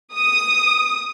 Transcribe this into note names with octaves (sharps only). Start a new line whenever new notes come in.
D#6